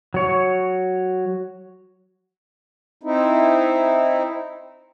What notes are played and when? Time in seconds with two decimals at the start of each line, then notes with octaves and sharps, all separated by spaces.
0.14 F#3 C#5
3.03 C4 D#4 E4